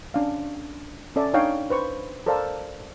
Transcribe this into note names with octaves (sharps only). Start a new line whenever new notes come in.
C#4 D4 F5
C#4 A4 D5 E5
D4 D#4 C#5 F5 G5 D#6
B4 C5 C#6
A4 A#4 C5 D5 F5 A5